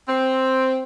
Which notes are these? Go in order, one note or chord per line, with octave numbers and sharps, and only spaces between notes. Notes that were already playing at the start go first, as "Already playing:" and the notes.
C4